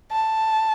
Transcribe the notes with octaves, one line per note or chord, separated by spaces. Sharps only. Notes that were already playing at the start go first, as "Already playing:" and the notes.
A5